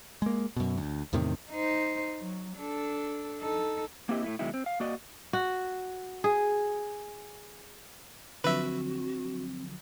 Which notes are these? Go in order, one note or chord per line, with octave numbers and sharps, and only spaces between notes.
G#3 A#3
F#2 B2
D2
E2 A2 C3 D#3
D#4 C5
F#3
D4 A4
D#4 A4
A#3 C4 E4 G4 D#5
A2 A3 E4
B2 D#3 F#3 G#3 D#4 E4
C4
F5
A#3 F#4 D5 D#5
F#4
G#4
D3 F3 F#3 C4 F#4 B4 E5